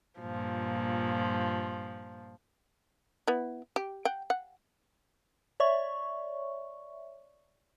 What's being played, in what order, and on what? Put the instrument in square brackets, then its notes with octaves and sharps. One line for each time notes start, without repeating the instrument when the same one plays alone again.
[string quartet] G2 A#2 F3
[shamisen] B3 E4
G4
F#5 G5
F#5
[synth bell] C#5 D5 E5 C#6